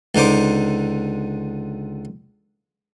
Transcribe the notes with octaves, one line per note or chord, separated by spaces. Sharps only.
C#2 D3 D#4 C5 D6